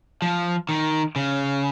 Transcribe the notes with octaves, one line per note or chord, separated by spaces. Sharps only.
F3
D#3
C#3